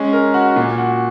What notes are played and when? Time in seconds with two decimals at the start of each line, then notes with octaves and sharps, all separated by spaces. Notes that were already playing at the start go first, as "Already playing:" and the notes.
Already playing: G#3 C#4
0.13 A#4
0.34 F#4
0.56 A#2
0.78 F#4